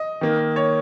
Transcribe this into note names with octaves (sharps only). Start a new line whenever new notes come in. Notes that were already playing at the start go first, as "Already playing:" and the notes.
Already playing: D#5
D#3 A#3
C#5